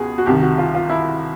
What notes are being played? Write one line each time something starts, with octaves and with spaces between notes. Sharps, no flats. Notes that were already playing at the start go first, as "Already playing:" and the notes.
Already playing: C#2 B2 G#4
F#4
C2 C3 D#3 G4
F#4
F4
F4
E4